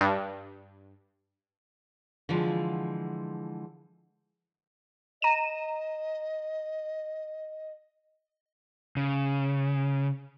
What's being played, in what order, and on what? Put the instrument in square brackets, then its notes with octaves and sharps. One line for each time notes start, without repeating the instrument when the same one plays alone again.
[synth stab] G2
[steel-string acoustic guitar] D3 E3 F3 G#3
[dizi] D#5 [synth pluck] A#5 D#7 E7
[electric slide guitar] C#3